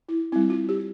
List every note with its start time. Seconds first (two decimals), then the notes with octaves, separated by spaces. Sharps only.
0.09 E4
0.32 G3 C4 E4
0.50 F4
0.69 G4